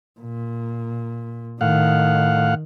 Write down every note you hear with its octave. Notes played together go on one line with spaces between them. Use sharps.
A#2
A2 D#3 F5 F#5